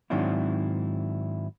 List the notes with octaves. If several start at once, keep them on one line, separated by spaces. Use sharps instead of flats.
G#2 D#3 F#3 C4 D4 E4